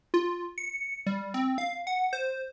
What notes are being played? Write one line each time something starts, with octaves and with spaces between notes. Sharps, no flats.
F4
C#7
G3
C4
F5
F#5
C5